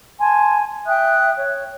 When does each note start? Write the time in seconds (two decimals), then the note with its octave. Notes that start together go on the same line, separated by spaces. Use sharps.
0.20 G#5 A5 C6
0.86 E5 G5 D#6 F#6
1.37 C#5